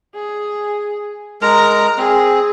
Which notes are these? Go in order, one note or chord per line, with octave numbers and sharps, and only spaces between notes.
G#4
G#3 A#4 A#5
C4 G#4